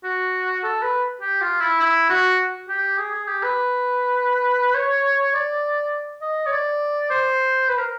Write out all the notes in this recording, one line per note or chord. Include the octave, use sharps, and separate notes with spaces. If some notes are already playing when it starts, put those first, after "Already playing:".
F#4
A4
B4
G4
F4
E4
E4
F#4
G4
G#4
G#4
G4
B4
C#5
D5
D#5
C#5
D5
C5
B4
A#4